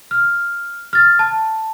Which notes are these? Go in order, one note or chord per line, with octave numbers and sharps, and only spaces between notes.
F6
F6 A6
A5